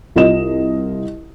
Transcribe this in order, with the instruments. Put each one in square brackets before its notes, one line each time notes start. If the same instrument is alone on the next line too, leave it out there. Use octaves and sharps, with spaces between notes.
[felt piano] C2 F4 D#5 E7